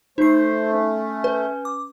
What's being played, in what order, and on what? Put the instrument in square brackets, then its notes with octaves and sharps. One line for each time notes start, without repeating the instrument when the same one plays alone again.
[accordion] A3 [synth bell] D#4 C7 [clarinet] C5
[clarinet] C#4
[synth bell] B4
D6